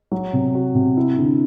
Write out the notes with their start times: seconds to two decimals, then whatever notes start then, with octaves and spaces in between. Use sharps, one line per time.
0.12 F#3
0.33 C3
0.55 F#4
0.75 C3
0.97 E4
1.18 D3